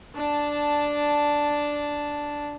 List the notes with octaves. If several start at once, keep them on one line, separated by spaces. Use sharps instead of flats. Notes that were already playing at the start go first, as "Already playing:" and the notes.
D4 A5